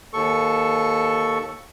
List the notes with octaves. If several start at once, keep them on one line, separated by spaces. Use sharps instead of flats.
D#2 A4 C#6